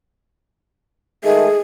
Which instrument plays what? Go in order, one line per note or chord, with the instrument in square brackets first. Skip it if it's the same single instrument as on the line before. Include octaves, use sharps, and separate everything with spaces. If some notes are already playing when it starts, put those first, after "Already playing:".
[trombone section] D#3 G#3 A3 [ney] G#4